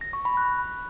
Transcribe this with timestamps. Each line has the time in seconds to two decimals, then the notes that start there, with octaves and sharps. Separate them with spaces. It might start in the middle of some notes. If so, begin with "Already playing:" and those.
0.01 A#6
0.13 C#6
0.25 B5
0.37 F#6